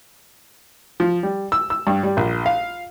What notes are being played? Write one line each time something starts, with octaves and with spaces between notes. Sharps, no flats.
F3
G3
E6
E6
G2
G3
A#1
F5